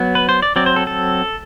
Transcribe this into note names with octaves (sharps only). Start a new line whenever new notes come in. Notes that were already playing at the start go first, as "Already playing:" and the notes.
Already playing: F#3 B3
B4
C5
D5
F#3 C4 D5
C5
A4
A4